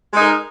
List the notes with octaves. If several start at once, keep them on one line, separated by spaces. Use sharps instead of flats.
G#3 D#4 A#4